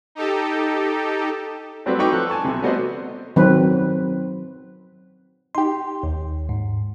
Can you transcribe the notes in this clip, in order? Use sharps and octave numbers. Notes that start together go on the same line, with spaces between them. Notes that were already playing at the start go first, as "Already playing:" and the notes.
D#4 G4 A4
F#3 G3 A3 C4 F#4 B4
D#4 A4 B4 G5 C#6 D6
F3 A4 F#6
G#5 A5 C#6
B1 C3
G3 A3 B3 F#4 C5 D#5
D#3 F#3 C4 B4
D#4 G4 C6
D#2
G#2